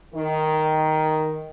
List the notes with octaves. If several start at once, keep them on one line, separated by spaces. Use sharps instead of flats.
D#3